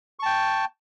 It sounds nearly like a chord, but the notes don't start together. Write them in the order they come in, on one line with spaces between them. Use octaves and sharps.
C#6 A5 G5